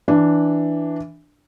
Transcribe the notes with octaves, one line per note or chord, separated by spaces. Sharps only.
E3 D4